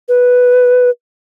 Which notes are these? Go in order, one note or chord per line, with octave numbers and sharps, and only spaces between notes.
B4